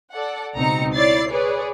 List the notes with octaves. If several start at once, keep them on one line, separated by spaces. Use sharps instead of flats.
A4 D5 F#5
C#2 B2 C4 D#4 A#5 C#7
E4 C#5 D5 A6 C7
G#4 B4 C#5 D5